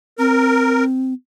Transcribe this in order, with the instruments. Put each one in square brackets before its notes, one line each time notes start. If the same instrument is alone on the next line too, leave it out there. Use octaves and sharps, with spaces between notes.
[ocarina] C4 [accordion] A#4